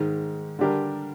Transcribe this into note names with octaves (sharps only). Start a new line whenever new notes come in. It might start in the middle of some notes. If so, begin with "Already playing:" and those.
Already playing: G#2 D#3 G#3
D3 G3 D4 G4 A#4